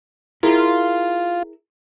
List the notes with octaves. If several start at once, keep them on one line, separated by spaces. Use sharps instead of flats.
E4 F4 G#4 A#4